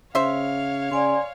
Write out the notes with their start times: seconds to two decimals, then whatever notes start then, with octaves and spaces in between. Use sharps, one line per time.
0.15 C#3 C5 C#5 E5 F5
0.91 C#3 D5 G#5 C6